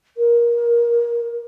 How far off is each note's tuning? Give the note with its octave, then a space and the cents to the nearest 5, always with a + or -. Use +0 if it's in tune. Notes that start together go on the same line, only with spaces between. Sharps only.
A#4 +20